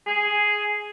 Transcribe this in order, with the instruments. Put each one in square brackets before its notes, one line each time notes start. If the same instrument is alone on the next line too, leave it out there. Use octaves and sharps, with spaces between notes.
[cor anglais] G#4